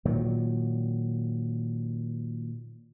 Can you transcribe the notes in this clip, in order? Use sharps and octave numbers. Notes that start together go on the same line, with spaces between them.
A#2 D#3 F#3